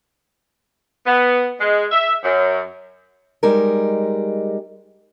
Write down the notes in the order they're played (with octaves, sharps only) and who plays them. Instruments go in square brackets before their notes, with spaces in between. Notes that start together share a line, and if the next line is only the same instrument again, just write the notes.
[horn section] B3
G#3
E5
F#2
[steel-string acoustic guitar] G3 G#3 D#4 A#4